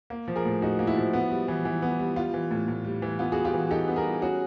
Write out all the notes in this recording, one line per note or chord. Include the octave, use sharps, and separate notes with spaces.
A#3
F3
G#4 A#4
A2
D#4 F#4 G#4
A#3
E4 F#4
F3
B3
G3
E3
E3
B3
G3
G3 F4
E3
A2
A2
G3
E3
B3 F4
G3 F#4 G#4
F4 G4
E3
D#4 G4 A4
B3
G#4 A#4
G3
C#4 F#4 G#4